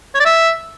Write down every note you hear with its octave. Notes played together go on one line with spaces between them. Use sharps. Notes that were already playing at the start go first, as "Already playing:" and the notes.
C#5
D5
E5